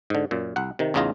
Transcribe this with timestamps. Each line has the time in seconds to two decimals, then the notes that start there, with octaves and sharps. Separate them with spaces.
0.10 G#2 D3
0.31 F#2 A#2
0.56 C2 F#5
0.79 C3 D#3
0.94 A1 E2 C#3 D#4 F4 A#5